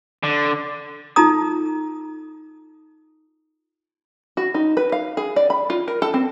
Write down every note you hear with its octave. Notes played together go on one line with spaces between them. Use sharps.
D3
D#4 F4 A4 A#5 D#6
F#4
D#4
B4
F5
G#4
D5
B5
F4
A#4
A4
C4